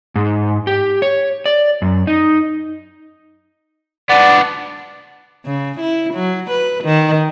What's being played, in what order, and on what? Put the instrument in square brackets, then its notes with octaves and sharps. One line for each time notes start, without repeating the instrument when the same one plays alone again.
[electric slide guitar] G#2
G4
C#5
D5
F#2
D#4
[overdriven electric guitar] B3 D4 [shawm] D5 [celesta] F#5
[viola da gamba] C#3
E4
F#3
B4
D#3